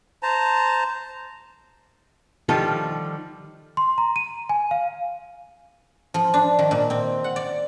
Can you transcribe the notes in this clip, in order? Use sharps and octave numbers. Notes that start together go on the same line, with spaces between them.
C5 A5 A#5
D3 D#3 F3 G3 F4 A4
C6
A#5
D#7
G#5
F5
F3
D4
D#3
A#2
C4
F#5
D5